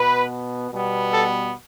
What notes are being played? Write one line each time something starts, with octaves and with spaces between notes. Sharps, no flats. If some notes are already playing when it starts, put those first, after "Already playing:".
Already playing: B2 B3 B4
B2 G3 B3
A4